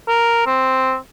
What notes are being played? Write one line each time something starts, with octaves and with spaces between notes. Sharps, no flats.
A#4
C4